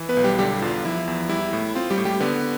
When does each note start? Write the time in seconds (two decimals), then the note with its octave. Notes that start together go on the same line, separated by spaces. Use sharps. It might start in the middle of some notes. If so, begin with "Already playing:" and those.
Already playing: E3
0.09 B3 B4
0.17 B1
0.24 G3 G4
0.38 D3 G3 G4
0.62 E2 F4
0.85 F3 E4
1.07 E2
1.29 G3 E4
1.53 A2
1.75 C4 F4
1.90 G3 G4
1.98 A2
2.05 G3 G4
2.20 D3 B3 B4